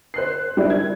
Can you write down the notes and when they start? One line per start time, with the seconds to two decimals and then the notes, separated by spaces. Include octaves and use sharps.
0.14 C5 F#6 C7
0.57 G3 D4 E4
0.70 G#6